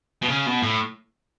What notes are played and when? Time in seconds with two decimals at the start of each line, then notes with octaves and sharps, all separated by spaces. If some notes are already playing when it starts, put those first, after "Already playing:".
0.22 B2
0.29 C#3
0.46 B2
0.63 A2